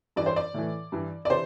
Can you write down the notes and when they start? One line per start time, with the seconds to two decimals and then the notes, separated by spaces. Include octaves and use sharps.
0.16 G2 E3 D5
0.26 C5
0.36 D5
0.54 A2 E3
0.92 G2 E3
1.25 D5
1.30 C3 E3 C5